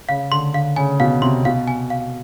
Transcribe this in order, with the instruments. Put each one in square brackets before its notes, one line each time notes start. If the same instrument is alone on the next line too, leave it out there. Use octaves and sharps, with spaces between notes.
[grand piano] C#3 [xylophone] F5
[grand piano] D3 [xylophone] C6
[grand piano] D3 [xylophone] F5
[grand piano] C#3 [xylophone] G#5
[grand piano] B2 [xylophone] F5
[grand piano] C3 [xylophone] C6
[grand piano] B2 [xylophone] F5
[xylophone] G#5
F5